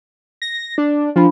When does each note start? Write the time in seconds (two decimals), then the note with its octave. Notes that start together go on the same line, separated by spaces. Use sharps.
0.42 A#6
0.78 D4
1.16 F3 D4 B5